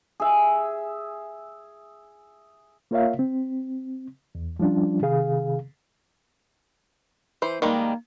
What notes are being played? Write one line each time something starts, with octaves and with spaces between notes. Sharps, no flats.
G#4 E5
A#3 F4 A#4 C#5 E5 F5
C4
E2
F3 G3 C#4 D4 F4
C3 D#3 G#4 F5
E3 C5
D#3 G3 G#3 A#3